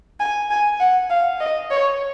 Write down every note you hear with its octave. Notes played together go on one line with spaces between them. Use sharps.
G#5
G#5
F#5
F5
D#5
C#5